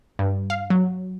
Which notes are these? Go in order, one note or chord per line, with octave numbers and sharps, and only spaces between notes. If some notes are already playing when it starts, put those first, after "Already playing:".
G2
F5
F#3